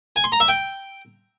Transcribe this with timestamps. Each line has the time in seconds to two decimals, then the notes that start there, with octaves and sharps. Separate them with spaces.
0.16 G#5
0.24 C6
0.32 A#5
0.40 E5
0.48 G5